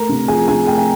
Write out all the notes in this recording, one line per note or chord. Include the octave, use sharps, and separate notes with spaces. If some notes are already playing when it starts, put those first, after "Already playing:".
Already playing: A3 A#4 A#5
C3
F3 G#4 G#5
C3 G#4 G#5
A3 G5
G#5